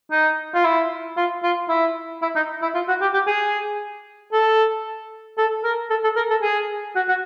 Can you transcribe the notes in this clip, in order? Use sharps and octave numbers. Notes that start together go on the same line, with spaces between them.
D#4
F4
E4
F4
F4
E4
E4
D#4
E4
F4
F#4
G4
G4
G#4
A4
A4
A#4
A4
A4
A#4
A4
G#4
F#4
F#4